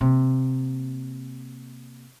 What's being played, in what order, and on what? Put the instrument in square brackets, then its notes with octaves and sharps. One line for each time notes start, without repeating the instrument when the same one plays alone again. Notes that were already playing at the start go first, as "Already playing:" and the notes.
[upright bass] C3 A#3